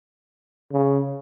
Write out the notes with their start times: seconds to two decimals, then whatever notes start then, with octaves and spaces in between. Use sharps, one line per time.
0.72 C#3